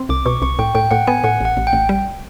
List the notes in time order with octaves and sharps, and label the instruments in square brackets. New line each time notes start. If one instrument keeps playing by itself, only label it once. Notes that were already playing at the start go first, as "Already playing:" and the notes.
Already playing: [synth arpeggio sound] C4
[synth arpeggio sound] C2 [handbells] D6
[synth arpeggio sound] B2 [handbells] C#6
[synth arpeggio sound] C2 [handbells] C#6
[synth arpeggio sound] A2 [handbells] G5
[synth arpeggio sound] A2 [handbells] G5
[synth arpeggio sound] A2 [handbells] F#5
[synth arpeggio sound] B3 [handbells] G#5
[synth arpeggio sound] A2 [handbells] F#5
[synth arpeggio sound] A1 [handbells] F#5
[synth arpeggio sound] A1
[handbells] G5
[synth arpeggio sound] A1
G3